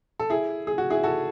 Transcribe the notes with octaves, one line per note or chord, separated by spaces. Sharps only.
A4
E4 G#4
G#4
F#4
E4 G#4
F#4 A4